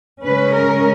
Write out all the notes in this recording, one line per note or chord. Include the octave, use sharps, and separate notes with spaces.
C#3 G#3 C#4 B4
A#4